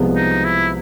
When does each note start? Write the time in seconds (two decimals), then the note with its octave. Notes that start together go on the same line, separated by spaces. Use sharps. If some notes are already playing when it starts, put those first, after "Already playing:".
Already playing: C2 C3 F3 G#3 B3
0.16 D#4
0.44 E4